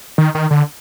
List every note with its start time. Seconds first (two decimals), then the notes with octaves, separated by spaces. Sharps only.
0.18 D#3
0.35 D#3
0.51 D3